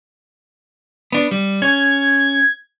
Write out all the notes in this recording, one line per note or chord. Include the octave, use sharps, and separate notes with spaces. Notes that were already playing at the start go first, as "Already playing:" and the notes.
B3 D4
G3
C#4 G#6